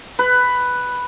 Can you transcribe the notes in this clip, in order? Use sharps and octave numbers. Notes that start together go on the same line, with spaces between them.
B4